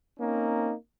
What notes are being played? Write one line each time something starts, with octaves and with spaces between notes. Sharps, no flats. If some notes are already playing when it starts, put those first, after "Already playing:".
A#3 C4 C#4 D#4